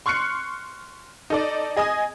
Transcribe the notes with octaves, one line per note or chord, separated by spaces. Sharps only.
C6 C#6 F6 F#6 C7 C#7
D#4 A4 D5
G#4 D#5 G#5 D#6